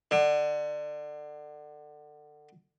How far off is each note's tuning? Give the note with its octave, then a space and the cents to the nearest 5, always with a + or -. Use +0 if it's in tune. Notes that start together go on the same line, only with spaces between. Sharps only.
D3 +25